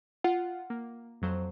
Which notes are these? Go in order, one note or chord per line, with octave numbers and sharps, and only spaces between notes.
F4 F#5
A#3
F2 F#3 C5